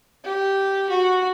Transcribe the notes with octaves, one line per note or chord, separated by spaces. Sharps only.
G4
F#4